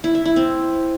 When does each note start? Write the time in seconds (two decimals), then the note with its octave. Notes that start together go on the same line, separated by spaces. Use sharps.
0.04 E4
0.15 E5
0.25 E4
0.36 C4